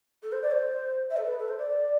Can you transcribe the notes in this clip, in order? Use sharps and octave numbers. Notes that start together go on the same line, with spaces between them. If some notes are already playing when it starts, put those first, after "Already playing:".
A4
C5
D5
C5
E5
A4
B4
A4
C5
D5